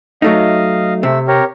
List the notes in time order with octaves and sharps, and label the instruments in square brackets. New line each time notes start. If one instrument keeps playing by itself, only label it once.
[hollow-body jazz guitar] F#3 A3 D#4 [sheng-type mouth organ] D#5 F5
[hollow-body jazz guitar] C3 [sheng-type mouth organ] A3 E5 E6
[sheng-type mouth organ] G4 A#4 C#5